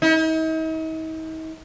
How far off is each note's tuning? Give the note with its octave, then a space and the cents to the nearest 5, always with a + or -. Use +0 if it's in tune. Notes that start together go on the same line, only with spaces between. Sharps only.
D#4 +45